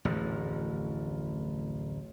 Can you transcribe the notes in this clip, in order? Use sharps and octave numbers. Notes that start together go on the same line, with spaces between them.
D1 A1 F2